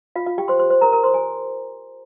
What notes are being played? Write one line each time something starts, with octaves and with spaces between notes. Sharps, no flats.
F4 F5
F4 F5
G4 G5
C5 C6
C5 C6
C5 C6
A#4 A#5
A#4 A#5
C5 C6
G#5